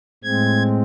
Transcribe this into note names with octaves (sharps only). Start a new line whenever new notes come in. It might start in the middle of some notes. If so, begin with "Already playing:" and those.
A2 G#3 C4 G#6